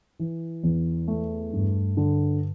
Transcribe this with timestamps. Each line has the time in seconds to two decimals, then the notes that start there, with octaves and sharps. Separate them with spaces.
0.19 E3
0.63 E2
1.08 A3
1.53 G2
1.97 D3